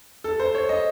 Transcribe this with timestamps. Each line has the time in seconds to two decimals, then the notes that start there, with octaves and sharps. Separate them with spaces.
0.24 A4
0.40 C5
0.55 C#5
0.69 D#5